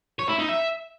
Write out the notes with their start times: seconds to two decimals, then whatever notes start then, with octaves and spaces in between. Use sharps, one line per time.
0.19 C#5
0.29 E4
0.39 D#4
0.49 E5